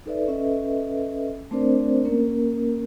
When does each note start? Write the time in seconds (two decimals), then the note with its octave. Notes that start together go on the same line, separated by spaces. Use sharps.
0.06 D#4 A4 B4 D5 E5
0.28 C#4 A4 B4 D#5 E5
1.51 A3 C4 D4 A#4 C5 D5
2.05 A#3 C#4 A#4